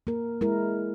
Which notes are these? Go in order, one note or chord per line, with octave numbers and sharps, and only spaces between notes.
A#3 A#4
G#3 E4 A#4